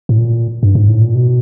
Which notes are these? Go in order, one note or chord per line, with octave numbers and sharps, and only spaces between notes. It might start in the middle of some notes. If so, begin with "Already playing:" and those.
A2
A#2
G2
G#2
A2
A#2
B2